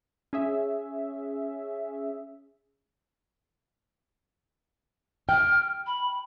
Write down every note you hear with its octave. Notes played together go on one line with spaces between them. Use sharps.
C#4 G#4 E5
G5 F6
B5